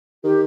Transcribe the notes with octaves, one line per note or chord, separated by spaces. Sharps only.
D#3 G4